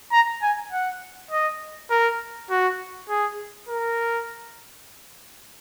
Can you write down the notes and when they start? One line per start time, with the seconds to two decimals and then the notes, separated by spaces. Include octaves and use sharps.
0.13 A#5
0.42 G#5
0.72 F#5
1.31 D#5
1.90 A#4
2.50 F#4
3.09 G#4
3.69 A#4